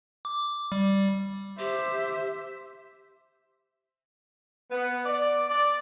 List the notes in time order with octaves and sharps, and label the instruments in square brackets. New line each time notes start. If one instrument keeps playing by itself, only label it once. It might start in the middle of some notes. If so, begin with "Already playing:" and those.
[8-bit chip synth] D6
G3
[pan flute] G4 [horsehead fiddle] C5 E5
[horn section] B3
D5
D5